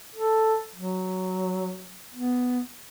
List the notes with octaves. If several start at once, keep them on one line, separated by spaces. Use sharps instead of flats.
A4
F#3
B3